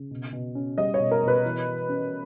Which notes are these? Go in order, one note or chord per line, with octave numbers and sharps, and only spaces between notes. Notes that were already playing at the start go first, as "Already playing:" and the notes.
Already playing: C#3
B2
B2
C#4
G3 D#5
C#5
B2
A#4
B2
B4
E3
E3
C#4